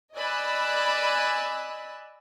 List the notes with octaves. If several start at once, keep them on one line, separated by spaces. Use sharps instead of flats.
D5 D#5 G#5 B5 E6 F#6